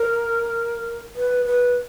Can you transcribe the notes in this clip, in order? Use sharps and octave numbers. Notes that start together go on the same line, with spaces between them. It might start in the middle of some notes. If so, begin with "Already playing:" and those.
Already playing: A#4
B4
B4